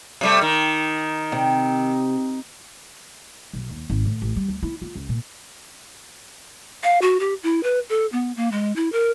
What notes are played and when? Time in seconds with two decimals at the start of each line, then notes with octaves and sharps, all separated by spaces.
0.21 C3 G3 A3
0.41 D#3
1.32 C3
3.53 B1
3.70 D#2
3.90 G#1
4.05 A2
4.22 A1
4.36 G3
4.48 D2
4.63 E4
4.82 F4
4.95 C#2
5.09 A#2
6.83 F5
7.02 F#4
7.20 G4
7.43 E4
7.63 B4
7.90 A4
8.12 B3
8.36 A#3
8.52 G#3
8.76 E4
8.92 A#4